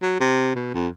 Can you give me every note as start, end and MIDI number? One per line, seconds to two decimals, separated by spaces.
0.02 0.18 54
0.20 0.55 48
0.55 0.70 47
0.74 0.88 41